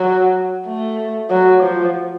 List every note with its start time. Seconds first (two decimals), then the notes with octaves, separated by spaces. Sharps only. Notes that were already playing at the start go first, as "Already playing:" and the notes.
Already playing: F#3
0.67 A3
1.31 F#3
1.63 F3